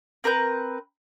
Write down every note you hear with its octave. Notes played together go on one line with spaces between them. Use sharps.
C4 A#4 B4 G6